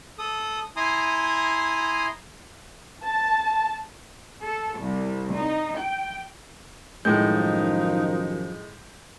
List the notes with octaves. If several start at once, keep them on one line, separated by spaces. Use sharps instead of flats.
A4 D#6
E4 G#5 A#5 C6 D#6
A5
A4
C2
D#4
G5
F#2 A2 D#3 F3 G#3 D#4 G6